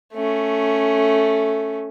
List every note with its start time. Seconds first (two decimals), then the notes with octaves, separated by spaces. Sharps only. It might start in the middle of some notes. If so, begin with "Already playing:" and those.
0.13 A3 C#4